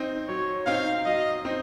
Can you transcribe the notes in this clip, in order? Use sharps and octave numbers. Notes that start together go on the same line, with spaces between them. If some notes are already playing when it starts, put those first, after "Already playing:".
Already playing: C4 D#4
F#3 C#5
C4 D#4 F5
F#3 D#5
C4 D#4